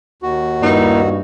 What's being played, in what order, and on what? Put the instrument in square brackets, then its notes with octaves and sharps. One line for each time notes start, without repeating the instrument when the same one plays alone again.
[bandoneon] D#2 F#4
[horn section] G2 [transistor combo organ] A#3 E4 [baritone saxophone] D#4